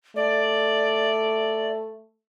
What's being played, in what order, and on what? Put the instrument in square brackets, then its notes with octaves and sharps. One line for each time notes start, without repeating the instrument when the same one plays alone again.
[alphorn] A3 [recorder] D5